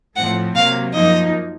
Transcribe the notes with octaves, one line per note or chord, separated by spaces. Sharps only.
A2 F3 A3 C4 F#5
C3 F#3 A#3 F5
F#2 F3 A#3 D#4 D#5